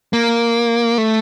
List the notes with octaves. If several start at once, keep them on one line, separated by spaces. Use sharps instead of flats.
A#3
A3